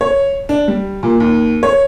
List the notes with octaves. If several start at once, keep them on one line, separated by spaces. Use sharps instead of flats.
C#5
D4
G3
A#2
D#2
C#5